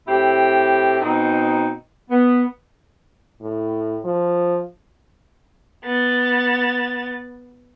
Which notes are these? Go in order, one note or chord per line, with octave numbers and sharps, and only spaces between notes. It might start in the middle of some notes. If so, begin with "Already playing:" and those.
A2 C4 E4 G4
B2 C4 D#4
B3
A2
F3
B3 A6